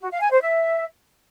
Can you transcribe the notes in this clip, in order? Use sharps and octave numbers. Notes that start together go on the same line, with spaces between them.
F#4
F5
G#5
C5
E5